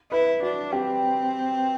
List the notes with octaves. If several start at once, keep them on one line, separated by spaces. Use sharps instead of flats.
E4 B4
D4 F#4
C4 G4